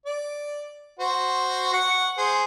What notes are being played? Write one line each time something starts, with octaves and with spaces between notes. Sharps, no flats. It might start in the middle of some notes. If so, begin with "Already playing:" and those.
D5
F#4 C5
F#5 C#6
G#4 C5